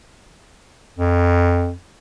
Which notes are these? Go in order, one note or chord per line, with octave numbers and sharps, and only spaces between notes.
F2